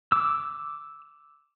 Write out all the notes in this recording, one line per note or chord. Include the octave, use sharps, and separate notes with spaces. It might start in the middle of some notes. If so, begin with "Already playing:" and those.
D6 E6